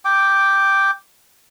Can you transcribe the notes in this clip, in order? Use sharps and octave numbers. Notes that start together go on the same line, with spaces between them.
G5 D6